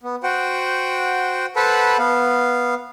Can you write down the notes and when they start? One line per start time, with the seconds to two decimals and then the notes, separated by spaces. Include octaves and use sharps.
0.03 B3
0.23 F#4 C5 F#5 G5
1.56 A4 B4 C5 F#5 A5 B5
1.99 B3 F5